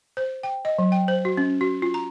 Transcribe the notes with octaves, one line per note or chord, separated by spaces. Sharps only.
C5
G5
D#5
F#3
G5
C5
F#4
C#4
F#4
F4
A#5